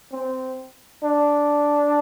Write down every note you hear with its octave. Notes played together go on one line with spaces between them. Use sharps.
C4
D4